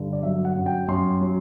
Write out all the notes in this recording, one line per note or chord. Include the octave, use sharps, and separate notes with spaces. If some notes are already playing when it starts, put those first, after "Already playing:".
Already playing: G2 D3
D5
F#3 E5
F#5
F#2
G5
F#2 C6
F#3